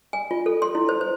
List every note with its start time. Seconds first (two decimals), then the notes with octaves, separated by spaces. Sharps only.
0.13 G#5
0.31 F4
0.46 A4
0.62 C6
0.75 E4
0.89 C5
1.01 C5